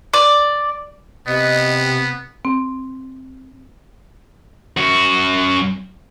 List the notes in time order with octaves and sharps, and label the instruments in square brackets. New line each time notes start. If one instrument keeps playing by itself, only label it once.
[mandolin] D5
[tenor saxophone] C3 [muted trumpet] B3 [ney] D#5
[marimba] C4
[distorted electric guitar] F#2 F#4